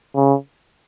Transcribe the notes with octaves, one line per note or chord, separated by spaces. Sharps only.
C#3